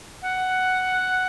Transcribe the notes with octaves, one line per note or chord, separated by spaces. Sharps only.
F#5